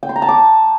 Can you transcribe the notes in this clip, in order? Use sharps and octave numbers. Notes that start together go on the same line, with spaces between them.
G5
C6
A#5
A5
D6